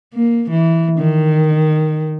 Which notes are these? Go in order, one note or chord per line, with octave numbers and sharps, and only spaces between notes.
A#3
E3
D#3